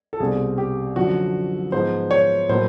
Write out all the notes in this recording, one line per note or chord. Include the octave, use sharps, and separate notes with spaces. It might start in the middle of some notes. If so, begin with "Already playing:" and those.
A4
C2 B2 G3 C4 G#4
G4
F#2 D3 F3 F#4
G#2 F3 G#3 B3 C5
C#5
A2 F#3 A#3 C5